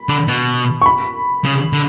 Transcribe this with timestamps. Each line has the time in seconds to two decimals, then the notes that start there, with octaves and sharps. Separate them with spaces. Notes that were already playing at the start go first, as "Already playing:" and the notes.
Already playing: B5
0.09 D3
0.28 B2
0.81 C#6
0.86 B5
1.44 C#3
1.73 D3